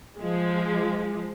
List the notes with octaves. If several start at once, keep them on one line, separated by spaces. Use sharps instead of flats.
F3 G#3